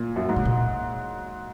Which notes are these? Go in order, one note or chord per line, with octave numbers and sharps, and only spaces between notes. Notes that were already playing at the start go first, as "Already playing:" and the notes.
Already playing: A#2
F#2
G#2
C#3
A#2